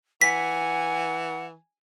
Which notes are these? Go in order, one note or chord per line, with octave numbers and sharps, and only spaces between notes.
E3 F#5 G#5 B6